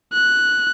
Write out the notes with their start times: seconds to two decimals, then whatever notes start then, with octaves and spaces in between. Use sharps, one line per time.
0.14 F#6